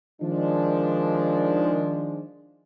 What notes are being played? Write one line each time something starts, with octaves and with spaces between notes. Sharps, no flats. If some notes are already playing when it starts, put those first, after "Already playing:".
D#3 F3 G#3 D4